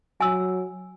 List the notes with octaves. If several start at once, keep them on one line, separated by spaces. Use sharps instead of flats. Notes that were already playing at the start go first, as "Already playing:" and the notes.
F#3 G#5 E6